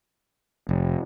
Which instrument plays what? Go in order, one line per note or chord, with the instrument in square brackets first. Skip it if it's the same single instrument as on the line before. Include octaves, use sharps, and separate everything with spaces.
[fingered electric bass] F1